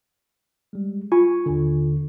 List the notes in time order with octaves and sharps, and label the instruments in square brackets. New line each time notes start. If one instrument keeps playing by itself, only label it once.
[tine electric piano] G3 G#3
[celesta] F4 [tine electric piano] G#5 C#6
[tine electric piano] D#2 D3